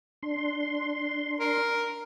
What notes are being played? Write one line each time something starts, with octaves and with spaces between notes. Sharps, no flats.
D4 C6
A#4